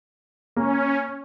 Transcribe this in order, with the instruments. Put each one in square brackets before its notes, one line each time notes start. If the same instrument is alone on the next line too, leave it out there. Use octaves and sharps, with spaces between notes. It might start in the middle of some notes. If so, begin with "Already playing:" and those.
[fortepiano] A#3 [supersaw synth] C#4